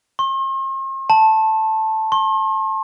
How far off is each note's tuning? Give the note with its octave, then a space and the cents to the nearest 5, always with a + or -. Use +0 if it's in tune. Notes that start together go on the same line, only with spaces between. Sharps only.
C6 +45
A5 +0
C6 +45